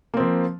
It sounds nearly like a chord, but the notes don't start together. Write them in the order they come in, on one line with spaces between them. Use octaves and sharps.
A#3 C4 F3